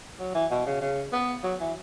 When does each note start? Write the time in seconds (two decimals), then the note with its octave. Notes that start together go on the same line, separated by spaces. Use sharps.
0.19 F#3
0.34 E3
0.51 B2
0.66 C#3
0.81 C#3
1.13 B3
1.44 F#3
1.60 E3